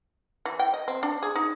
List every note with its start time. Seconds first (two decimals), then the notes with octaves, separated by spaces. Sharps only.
0.45 E3
0.59 G5
0.74 D#5
0.88 C4
1.03 D4
1.23 G#4
1.36 D#4